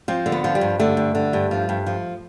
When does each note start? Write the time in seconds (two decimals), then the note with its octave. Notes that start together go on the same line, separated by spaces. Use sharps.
0.08 F3 C4
0.26 D3
0.32 B3
0.44 F3
0.55 G3
0.61 G2
0.79 D3 A3
0.97 G2
1.15 D3
1.33 G2
1.51 F3
1.69 G2
1.86 F3